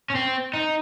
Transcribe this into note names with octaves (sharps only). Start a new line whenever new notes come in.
C#4
C4
D#4